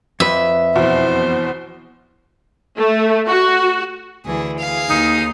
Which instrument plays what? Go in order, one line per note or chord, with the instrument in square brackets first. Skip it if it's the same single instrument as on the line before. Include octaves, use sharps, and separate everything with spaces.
[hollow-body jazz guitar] F2 B4 [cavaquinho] E5
[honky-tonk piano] E2 B2 [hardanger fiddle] C5
[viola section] A3
F#4
[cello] D2 E3 [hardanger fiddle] G#4
[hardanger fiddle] G#4 F5
[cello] D#2 [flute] D#4